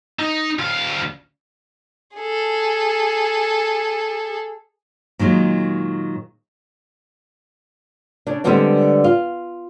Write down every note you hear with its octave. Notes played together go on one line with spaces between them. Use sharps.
D#4
D2 F5
G#4 A4
A#2 D#3 F#3 G#3
C#3 D4
D3 G3 G#3 B3 C4 D4
F4